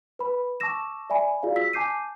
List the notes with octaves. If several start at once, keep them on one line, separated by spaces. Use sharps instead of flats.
B4 B5
A5 C#6 D6 E6 A#6 E7
D5 E5 G#5 B5
F4 F#4 G#4 D5 F5
E6 B6
G#5 A5 D6 G6 C7 D#7